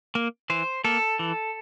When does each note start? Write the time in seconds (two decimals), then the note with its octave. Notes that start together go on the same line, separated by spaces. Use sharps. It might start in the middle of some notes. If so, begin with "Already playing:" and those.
0.15 A#3
0.50 E3 C5
0.84 A#3 A4
1.19 E3